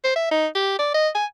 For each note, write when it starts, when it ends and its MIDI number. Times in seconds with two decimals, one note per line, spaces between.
0.04 0.16 72
0.16 0.29 76
0.31 0.47 63
0.55 0.78 67
0.79 0.90 74
0.94 1.09 75
1.15 1.25 80